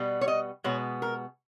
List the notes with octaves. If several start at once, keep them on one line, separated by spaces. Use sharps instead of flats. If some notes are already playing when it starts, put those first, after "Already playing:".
Already playing: B2 G3 B3
C#5
D#5
B2 G#3 B3 C#5
A#4